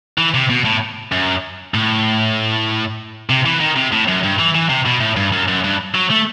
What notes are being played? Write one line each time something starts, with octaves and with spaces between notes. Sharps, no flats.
E3
C3
B2
A2
F#2
A2
C3
E3
D#3
C3
A2
F#2
G2
E3
E3
C3
B2
A2
G2
F#2
F#2
G2
F#3
A3